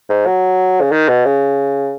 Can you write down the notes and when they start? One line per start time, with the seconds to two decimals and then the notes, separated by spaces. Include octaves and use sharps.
0.09 G#2
0.26 F#3
0.81 C#3
0.92 D#3
1.08 B2
1.25 C#3